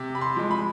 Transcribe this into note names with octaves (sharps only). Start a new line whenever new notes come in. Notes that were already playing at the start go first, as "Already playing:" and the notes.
Already playing: C3
B5
C6
F3 G#3
B5